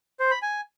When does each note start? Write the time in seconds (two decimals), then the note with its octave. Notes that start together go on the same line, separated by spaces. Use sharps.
0.20 C5
0.31 B5
0.42 G#5